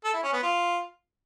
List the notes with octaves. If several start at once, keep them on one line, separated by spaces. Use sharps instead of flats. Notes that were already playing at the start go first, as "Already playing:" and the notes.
A4
E4
C#4
B3
F4